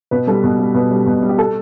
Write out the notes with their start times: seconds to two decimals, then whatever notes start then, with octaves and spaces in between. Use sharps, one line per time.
0.11 B2 B4
0.27 G3 A4
0.44 B2
0.59 G3
0.74 B2 B4
0.91 G3
1.06 B2
1.22 G3
1.29 G4
1.38 A4